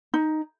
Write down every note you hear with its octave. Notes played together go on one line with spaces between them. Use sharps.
D#4